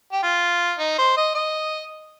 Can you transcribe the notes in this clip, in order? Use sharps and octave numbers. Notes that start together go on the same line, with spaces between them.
G4
F4
D#4
C5
D#5
D#5